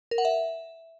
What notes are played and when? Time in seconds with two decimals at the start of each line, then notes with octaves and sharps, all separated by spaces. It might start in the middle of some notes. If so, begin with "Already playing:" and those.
0.11 A#4
0.18 F#5
0.25 E5